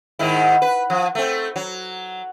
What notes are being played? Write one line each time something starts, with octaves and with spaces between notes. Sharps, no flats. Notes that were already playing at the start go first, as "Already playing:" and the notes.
G#2 D#3 E4
B4
F3
A3 C4
F#3